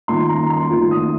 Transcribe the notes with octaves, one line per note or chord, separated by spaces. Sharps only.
D#3 A#3 F4 C6
A#5
C6
D#3 A#3 F4
D#6